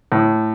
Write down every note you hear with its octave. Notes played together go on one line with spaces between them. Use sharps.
A2